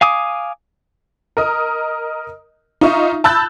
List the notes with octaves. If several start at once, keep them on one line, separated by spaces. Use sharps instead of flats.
F5 G#5 D6 D#6
A#4 D#5 D#6
D#4 F4 E5 C#6
A5 B5 E6 F#6 G6 A6